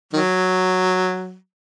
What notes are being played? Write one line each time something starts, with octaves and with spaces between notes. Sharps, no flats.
D#3 F#3